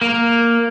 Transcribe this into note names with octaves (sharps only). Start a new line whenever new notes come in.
A#3